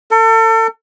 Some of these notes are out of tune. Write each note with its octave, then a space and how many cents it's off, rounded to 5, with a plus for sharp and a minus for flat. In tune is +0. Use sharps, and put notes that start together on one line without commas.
A4 +35